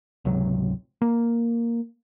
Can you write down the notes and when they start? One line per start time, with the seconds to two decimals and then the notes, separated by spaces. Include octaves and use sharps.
0.25 G#1 C#2 C3 F#3
1.02 A#3